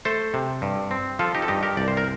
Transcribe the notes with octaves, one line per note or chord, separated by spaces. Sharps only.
A3 A4 C5
C3
G2
C4
F3 F4 A4
D#4 G4
A4
G2 D#4 G4
G4 A#4
C2 D5
C5
A#4